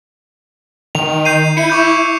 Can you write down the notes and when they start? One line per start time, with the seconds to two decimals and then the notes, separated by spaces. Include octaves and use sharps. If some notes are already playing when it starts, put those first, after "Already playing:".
0.95 D#3 F7
1.25 G6 C7 D#7
1.57 E4 C#7 D#7
1.70 C#6 D6 G6